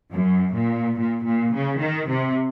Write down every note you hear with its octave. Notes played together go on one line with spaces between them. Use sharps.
F#2
A#2
A#2
A#2
C#3
D#3
C3